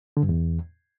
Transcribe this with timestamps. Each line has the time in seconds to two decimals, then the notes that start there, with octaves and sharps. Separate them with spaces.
0.17 D3
0.23 G2
0.29 E2